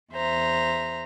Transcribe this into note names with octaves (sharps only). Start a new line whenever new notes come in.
E2 C5 E5 A#5